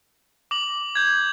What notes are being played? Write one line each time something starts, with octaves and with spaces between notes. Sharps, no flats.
D6 F#7
G6 G#6